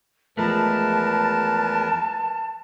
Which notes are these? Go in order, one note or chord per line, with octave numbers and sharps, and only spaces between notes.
E2 F3 G#3 A3 A#4 B4 A5